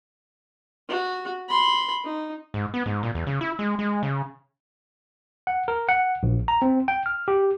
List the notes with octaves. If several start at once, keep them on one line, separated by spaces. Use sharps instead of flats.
F#4
B5 C6
D#4
G#2
B3
G#2
A#2
E2
C#3
E4
G#3
G#3
C#3
F#5
A#4
F#5
A#1
A#5
C4
G5
F6
G4